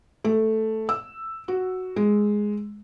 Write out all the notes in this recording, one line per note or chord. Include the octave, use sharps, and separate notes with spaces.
A3
E6
F#4
G#3